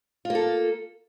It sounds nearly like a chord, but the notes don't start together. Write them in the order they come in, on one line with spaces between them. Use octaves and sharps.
F4 A#3 A4